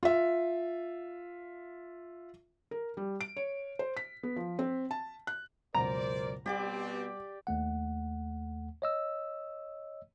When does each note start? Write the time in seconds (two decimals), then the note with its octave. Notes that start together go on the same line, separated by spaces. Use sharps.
0.03 F4 E5
2.71 A#4
2.97 G3
3.21 D7
3.37 C#5
3.79 C5
3.97 B6
4.23 B3
4.36 F3
4.59 C4
4.91 A5
5.27 F#6
5.75 C#2 F#2 B2 A#4 C5 D5 A#5
6.46 B2 G3 B3 C4 G4 D5 F#5 D6
7.47 D#2 A3 F#5
8.82 C#5 D#5 E6